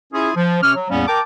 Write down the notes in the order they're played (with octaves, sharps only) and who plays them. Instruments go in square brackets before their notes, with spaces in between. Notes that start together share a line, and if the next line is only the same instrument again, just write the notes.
[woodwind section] C#4 E4 F4 G#4
F3
C3 C#4 D6 F6
F#3
E2 A2 G3 A#3 B3 C#4
A#4 G5 A5 D6